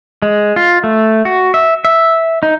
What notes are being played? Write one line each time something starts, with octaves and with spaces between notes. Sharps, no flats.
G#3
F4
A3
F#4
E5
E5
D#4